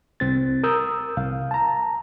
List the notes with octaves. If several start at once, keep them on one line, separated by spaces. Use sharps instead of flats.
C2 C4 A6
A#4 D#6 E6 G6
C2 F5
A5 A#5